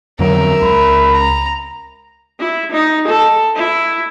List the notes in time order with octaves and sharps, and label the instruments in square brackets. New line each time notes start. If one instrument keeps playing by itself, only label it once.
[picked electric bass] F2 D3 F#3 [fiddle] A#4 E5
[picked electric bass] C#2 [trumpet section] B5
[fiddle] A#5
[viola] E4
D#4
A4
E4